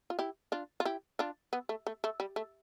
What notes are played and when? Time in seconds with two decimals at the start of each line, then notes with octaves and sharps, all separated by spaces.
0.10 F4
0.19 E4 G4
0.52 D4 F4
0.80 F4
0.85 E4 G4
1.19 D4 F4
1.53 B3
1.69 A3
1.87 A3
2.04 A3
2.20 G3
2.36 A3